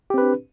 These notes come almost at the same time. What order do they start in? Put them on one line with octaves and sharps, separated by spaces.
G4 C4 B4 D4